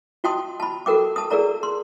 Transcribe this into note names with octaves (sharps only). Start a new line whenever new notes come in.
F4 F#4 G5 A5 C6 D#6
A5 B5
F#4 A4 A#4 G5 D6
A5 D#6
G#4 A#4 D5 A#5
C6